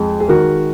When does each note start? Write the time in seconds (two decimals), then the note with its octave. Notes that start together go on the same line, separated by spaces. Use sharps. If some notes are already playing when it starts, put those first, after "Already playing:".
Already playing: F2 G#3
0.20 G#4
0.28 D#3 F#4 A#4